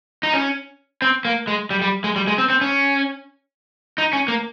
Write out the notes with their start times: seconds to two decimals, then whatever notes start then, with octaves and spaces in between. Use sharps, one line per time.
0.23 D#4
0.33 C#4
1.02 C4
1.25 A#3
1.47 G#3
1.71 G3
1.82 G3
2.04 G#3
2.16 G3
2.27 G#3
2.38 C4
2.50 C4
2.61 C#4
3.98 D#4
4.13 C#4
4.28 A#3